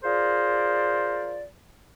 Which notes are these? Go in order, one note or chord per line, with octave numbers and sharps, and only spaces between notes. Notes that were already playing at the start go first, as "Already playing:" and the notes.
F4 G#4 A#4 C5 D5